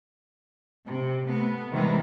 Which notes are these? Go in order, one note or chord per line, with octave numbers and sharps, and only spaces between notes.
C3
A3 B3
C3 D#3 E3 G3 G#3